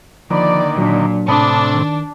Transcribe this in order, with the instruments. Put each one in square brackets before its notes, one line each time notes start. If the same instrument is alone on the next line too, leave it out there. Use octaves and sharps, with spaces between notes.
[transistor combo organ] D3 D#3 A#3 [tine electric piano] F3 B5 [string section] D5
[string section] A#2 [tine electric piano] F#3 D4
[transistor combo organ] A2 C3 [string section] D4 [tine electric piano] A5 B5 D#6
[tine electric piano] D#3